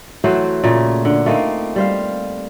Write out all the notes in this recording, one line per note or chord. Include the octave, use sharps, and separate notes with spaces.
E3 F#3 A3 C5
A#2 C#3 A3
D3
A3 A#3 C4 D#4
G3 C5 F5